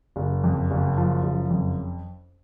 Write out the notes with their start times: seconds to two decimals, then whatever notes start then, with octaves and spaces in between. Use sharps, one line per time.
0.16 F#1
0.44 F2
0.71 F#1
0.98 F3
1.23 F#1
1.50 F2